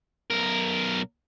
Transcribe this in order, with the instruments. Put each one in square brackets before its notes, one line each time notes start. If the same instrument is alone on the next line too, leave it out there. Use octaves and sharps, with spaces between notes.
[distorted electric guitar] B1 A#4